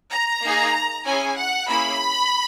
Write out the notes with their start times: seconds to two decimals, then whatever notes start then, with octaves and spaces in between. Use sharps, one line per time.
0.12 A#5
0.43 A#3 D#4 G#4
1.05 C#4 E4 G#4 G#5
1.37 F#5
1.68 A#3 C#4 E4 G#4 B5